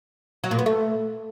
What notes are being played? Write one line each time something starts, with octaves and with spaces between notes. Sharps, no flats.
F#3
A#2
B3
A3